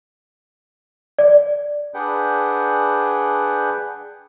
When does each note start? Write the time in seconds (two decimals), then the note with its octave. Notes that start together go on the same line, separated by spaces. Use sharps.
1.19 D5
1.94 D4 G#4 B4 F#5 G5